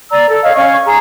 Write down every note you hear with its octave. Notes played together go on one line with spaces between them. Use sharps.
D5 A#5 E6
A4
C#5 D#5 F5
C#4 C#5 F5 C#6
G#4 A#5